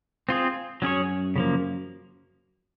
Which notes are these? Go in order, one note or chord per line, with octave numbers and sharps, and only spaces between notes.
C4 F4 G#4
F#2 F#3 C#4 G#4 C#5
C#3 F3 A#3